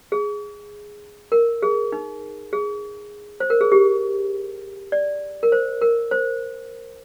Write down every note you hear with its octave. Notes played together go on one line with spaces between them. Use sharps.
G#4
A#4
G#4
D#4
G#4
C5
A#4
G#4
G4
D5
A#4
C5
A#4
C5